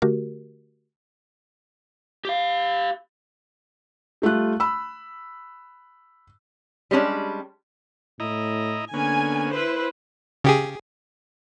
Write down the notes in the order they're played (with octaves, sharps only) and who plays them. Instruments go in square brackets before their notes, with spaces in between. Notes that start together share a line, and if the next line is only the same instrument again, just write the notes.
[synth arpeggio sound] D3 A3 F#4 G4 A#4
[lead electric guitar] G4 F5
[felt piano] G3 A3 F4 F#6
B5 E6
[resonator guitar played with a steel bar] G3 G#3 C#4 D4
[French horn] A2 [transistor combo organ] E4 D#5 A#5
[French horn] D3 [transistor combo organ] A#3 B3 C#4 [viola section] G#5
[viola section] E4 B4 C5
[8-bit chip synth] C#3 G4 G#4